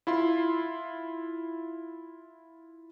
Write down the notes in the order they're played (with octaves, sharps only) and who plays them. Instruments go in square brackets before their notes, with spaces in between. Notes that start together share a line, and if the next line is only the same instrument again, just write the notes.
[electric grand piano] E4 F4 C6